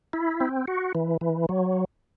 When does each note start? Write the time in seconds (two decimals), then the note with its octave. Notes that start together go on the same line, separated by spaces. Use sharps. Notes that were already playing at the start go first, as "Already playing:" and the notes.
0.13 E4
0.40 C4
0.68 F#4
0.95 E3
1.21 E3
1.49 F#3